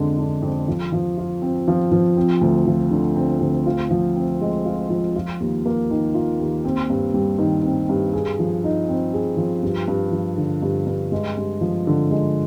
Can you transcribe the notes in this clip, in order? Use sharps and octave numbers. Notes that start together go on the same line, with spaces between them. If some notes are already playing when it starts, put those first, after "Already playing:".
Already playing: F2 D3 G#3 D4
D4
F2
F3
F3
F4
C4
F3
F3
C4
D2
F3
D3
C4
D2
F4
F3
C4
G#3
F4
F3
F4
D#2
A#3
D#3
F4
D#2
C4
G2
G3
D#3
C4
G2
G#4
F3
D#4
C4
G#4
F3
G2
G2
F3
D3
G2
G2
G#3
G2
F3
D3
G#3